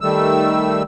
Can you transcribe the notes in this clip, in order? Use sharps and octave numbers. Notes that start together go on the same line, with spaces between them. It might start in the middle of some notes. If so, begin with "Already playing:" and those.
D#3 G3 A3 E6